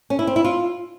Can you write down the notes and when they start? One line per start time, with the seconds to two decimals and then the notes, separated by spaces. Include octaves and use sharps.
0.10 C#4
0.19 E4
0.27 C4
0.36 E4
0.44 F4